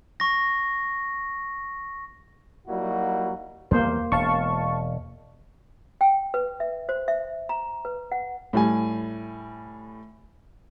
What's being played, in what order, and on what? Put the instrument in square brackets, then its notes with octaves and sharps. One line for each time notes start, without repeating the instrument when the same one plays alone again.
[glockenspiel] C#6 A#6
[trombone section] F#3 G3 A#3 D#4 E4 F#4
[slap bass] E2 G3 [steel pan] A#3 C5
[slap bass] E1 [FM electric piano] F5 A5 C#6
[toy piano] G5
B4
E5
C5
E5
A#5
B4
F#5
[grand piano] A2 G3 G#5